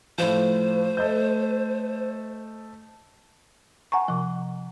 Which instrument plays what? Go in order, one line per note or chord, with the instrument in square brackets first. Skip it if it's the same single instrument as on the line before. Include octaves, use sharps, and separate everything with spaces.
[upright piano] A2 F3 [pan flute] C5
[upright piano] A3 D#5 G6
[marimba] F#5 G#5 A#5 C#6
C3 F3